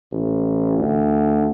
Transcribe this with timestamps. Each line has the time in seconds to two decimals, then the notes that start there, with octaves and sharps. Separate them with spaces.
0.12 A1
0.78 D2